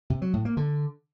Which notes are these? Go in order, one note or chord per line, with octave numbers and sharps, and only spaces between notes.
C3
F#3
A2
A#3
D3